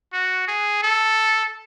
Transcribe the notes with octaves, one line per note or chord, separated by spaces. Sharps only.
F#4
G#4
A4